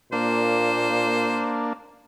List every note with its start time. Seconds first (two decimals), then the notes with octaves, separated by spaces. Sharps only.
0.13 A#2 A#3 D4 C5